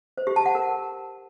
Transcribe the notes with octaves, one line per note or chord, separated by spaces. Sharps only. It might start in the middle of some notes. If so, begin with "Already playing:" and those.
C5
G4
A5
F#5
A#4